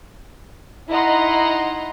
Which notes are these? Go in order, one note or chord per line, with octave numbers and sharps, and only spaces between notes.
D#4 E4 D#5 F#5 A#5 C6